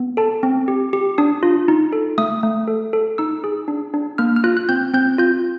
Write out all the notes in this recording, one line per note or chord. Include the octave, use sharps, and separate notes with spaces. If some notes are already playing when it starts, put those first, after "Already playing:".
Already playing: B3
A4 A5
C4
G4
G4
D4 D#6
F4
D#4
A4
A3 D#6
A3
A4
A4
D#4 E6
G#4
D4
D4
A#3 F6
F6
F4 F#6
F#6
C4 G6
C4 G6
F4 G6